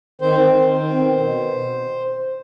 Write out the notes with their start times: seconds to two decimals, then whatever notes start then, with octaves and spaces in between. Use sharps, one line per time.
0.21 D#3 C4 C5
0.41 D#3
0.60 D#3
0.79 C4
0.98 B2
1.17 B2